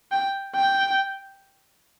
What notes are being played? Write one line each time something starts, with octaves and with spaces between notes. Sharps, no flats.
G5
G5